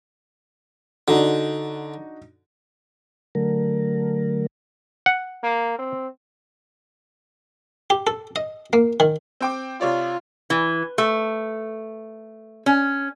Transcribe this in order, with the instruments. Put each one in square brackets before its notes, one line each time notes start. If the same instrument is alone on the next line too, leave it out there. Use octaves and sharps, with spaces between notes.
[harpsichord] D3 [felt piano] D4 D#4 F#4
[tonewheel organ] D3 F#3 A3 A#4
[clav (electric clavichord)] F#5
[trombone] A#3
C4
[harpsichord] G4
A4
D#5
A#3
D#3
[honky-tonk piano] C4 G5 D6
[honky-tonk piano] C3 C#5 D5 [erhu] F4
[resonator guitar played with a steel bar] E3
A3
C#4